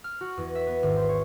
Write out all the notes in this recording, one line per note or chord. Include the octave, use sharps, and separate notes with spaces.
F6
F#4
E2
E5
B3
G#1
C5
C#5